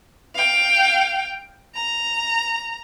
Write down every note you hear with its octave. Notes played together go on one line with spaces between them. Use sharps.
F5 G5
A#5